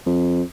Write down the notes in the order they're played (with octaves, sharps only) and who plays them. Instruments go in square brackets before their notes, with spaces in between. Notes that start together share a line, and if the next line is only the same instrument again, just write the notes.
[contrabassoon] F2